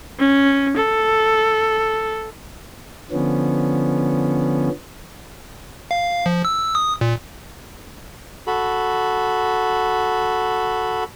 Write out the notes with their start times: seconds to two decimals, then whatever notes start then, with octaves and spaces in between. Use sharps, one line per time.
0.19 C#4
0.77 A4
3.12 D3 F3 B3 C#4
5.91 F5
6.26 F3
6.45 E6
6.75 D#6
7.01 A#2
8.47 F#4 A4 B5